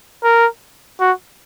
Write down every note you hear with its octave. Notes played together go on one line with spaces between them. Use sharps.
A#4
F#4